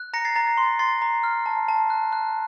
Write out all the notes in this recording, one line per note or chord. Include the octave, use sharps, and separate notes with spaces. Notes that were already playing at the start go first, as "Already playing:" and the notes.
Already playing: F#6
A#5 A#6 C#7
A6 C7
A#5 A6
A6
C6
C6 A6 C7
A#5
F6
A5
A5
F#6
F#6